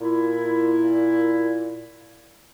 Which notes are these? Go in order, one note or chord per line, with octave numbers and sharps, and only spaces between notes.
A#2 E4